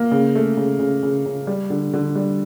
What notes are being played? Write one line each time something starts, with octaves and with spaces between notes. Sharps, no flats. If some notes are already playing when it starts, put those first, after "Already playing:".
Already playing: A#3
C#3
A3
C#3
C#3
C#3
C#3
G3
D3
D3
G3